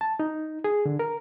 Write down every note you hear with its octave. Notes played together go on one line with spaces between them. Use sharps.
A5
D#4
G#4
D3
A#4